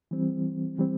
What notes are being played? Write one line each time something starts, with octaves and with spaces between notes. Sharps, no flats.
E3 G3 C4
E3 G3 C4